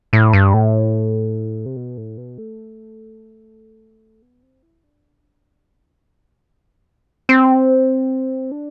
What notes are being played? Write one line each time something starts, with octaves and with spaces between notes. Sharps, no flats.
A2
G2
A2
C3
B2
A2
B2
A3
B3
C4
E4
D4
C4
D4